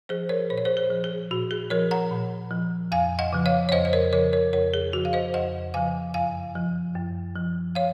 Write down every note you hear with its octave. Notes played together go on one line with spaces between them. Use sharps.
F3 G#4 C5
A#4 C#5
A#2 C5
C#5
G#4 C5
G#4
F3
G#4
A#2 F#4
G#4
F3 A#4 C#5
F#5 A#5
A#2
F3
F2 F5 G#5
D#5 F#5
C#3 F3
C#5 F5
C#5
F2 C5 D#5
D#5
A#4 C#5
C#3 F3 A#4 C#5
A#4 C#5
F2 A#4 C#5
G#4
C#3 F3 F#4
F5
C5 D#5
F2 D#5 F#5
C#3 F3 F5 G#5
F#2 F5 G#5
F3
F#2
F3
C#5 F5